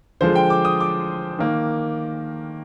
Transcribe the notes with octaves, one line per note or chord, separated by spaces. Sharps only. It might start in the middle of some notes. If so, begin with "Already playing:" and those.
D3 F3 G#3 C5
G5
D6
D#6
D6
D#3 A#3